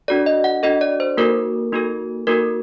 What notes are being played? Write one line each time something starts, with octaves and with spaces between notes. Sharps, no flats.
D4 F#4 A4 D5
D#5
F#5
D4 F#4 A4 D#5
D5
C5
A#3 D#4 F#4 A4 A#4
A#3 D#4 F#4 A4
A#3 D#4 F#4 A4 A#4